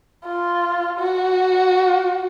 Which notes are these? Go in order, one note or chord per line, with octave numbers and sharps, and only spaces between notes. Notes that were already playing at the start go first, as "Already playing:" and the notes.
F4
F#4